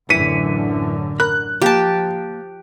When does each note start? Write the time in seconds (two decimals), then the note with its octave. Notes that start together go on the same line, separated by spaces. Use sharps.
0.10 A1 F#2 D3 E3 B6 C#7 D#7
1.20 A#4 B5 F#6
1.62 F3 A#3 G4 A5